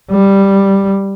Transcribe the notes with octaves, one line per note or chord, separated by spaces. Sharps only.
G3